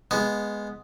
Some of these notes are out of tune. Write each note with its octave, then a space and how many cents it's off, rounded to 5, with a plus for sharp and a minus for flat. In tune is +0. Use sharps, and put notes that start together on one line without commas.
G#3 +0 B3 +0